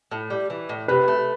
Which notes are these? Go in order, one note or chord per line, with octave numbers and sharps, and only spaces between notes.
A2
G3
E3
A2
C3 B4
A3